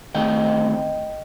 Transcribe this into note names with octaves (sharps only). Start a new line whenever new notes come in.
D#3 A3 C4 D#4 D#5 G5